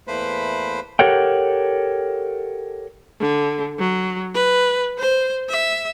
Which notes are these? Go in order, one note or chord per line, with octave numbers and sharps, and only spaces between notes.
E2 A3 A#3 B4 C5 B5
G4 A4 A#4 C#5 F#5 G5
D3
F#3
B4
C5
E5